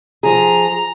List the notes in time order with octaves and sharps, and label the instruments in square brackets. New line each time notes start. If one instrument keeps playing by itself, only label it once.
[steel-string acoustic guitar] F3 G#4 [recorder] A#5